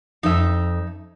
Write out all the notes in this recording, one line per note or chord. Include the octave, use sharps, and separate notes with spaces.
F2 D#4 E5